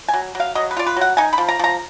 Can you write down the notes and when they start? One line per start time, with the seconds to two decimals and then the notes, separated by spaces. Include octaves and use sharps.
0.08 G#5
0.13 F#3
0.35 F#3
0.40 F5
0.55 F#3 D#5
0.71 B4
0.77 F4 D5
0.87 B4
0.96 F#3 F#5
1.17 D#4 G#5
1.33 B5
1.38 F3
1.49 A#5
1.59 F3 A#5